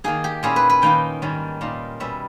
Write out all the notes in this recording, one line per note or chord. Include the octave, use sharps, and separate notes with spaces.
D#3 A#3 D#4 G#4
G4
A#2 A#3 C#4 E4 G#4
B4
B4
D#3 A#3 D#4 G5
G#2 D#3 G3 C#4
A#2 A#3 D#4
B2 G3 C#4 E5